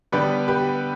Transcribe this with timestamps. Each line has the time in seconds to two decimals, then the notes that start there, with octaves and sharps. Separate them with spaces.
0.12 D3 G3 B3 G4 B4
0.48 G4 B4